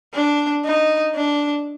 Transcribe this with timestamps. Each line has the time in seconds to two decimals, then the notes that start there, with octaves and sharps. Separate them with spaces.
0.15 D4
0.65 D#4
1.15 D4